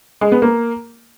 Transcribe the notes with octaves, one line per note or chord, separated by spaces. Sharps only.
G#3
B3
A#3